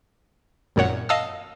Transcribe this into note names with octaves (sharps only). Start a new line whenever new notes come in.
G#1 F#2 A#2 C#5 F#5
D#5 F5 A5 D#6 E6